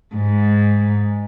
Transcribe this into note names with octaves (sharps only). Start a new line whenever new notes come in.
G#2